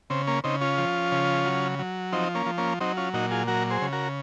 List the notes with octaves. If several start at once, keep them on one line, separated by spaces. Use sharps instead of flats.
C#3 C4
A#3 C#4
C#3 C4 D#4
C#4 F4
F3
C#3
F#3
F#3
F3 C4 D#4
A#3 C#4
F3
A#3 C#4
F#3 C4 D#4
C#4 F4
A#2 D#4 F#4
F4 G#4
F#3 F#4 A#4
G#4 C5
C#3
F#4 A#4